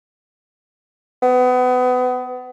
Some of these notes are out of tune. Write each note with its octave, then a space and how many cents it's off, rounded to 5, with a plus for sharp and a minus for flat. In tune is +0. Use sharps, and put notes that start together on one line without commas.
B3 +30